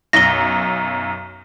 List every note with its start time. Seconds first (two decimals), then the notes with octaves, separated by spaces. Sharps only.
0.13 B1 F#2 A#6 G7